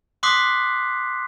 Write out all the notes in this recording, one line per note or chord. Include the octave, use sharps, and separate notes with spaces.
C6 D6 D#6 F#6 B6 C7